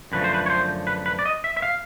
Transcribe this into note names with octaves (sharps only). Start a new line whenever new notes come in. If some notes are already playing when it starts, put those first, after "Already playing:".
F#2 D3 F3 A3 B4
C5
B4
C#5
C5
B4
B4
D5
D#5
E5
E5
F5